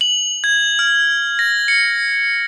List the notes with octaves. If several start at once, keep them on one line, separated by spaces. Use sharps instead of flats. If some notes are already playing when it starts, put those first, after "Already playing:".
F#7
G#6
F6
A#6
C#7